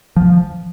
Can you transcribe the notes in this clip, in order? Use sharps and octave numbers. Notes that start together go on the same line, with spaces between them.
F3